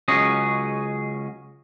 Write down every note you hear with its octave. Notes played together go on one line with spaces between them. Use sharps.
C#2 F#3 C#4 G#4 D#5